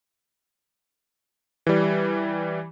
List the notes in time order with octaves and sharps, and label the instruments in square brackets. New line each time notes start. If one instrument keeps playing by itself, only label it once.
[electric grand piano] E3 G3